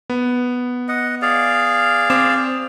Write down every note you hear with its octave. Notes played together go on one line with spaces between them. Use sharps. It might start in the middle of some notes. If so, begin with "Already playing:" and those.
B3
D#5 F#5
G#4 D5 F5
C4 D6 E7